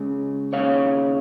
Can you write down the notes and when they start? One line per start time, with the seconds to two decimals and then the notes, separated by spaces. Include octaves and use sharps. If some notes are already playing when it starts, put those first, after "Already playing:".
Already playing: C#2 C#3
0.53 D#2 C#3 C#5 F5